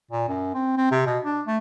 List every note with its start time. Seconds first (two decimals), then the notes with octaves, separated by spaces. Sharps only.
0.11 A#2
0.28 F#2
0.54 C4
0.77 C4
0.92 C3
1.06 B2
1.24 D4
1.47 A3